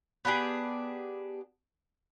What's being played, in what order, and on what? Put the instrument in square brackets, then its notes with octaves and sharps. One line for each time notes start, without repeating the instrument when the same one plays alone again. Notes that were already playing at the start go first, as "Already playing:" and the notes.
[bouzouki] B3 D4 G4 G#4